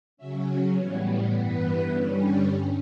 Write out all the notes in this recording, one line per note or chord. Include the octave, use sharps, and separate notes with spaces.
C#3 F#3 C#4 E5
C#5
A2 E3 G3 B3 C#5
G2 E3 B3 B4
G2 D3 G3 C#4
G2